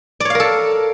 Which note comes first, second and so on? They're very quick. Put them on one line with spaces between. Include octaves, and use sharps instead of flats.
D5 C#5 F5 A#4 A4